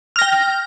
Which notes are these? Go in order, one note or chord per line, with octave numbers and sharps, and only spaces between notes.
G5 F6 A#6